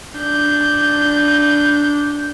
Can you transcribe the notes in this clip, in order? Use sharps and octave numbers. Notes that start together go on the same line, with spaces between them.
D4 G6